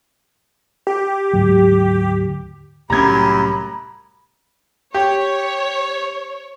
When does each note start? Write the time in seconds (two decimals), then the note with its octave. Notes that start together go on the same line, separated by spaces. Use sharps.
0.87 G4
1.33 D2 G#2 F#3
2.90 C2 F#2 A2 G3 G4 A#5 B5 G#6
4.94 G4 C#5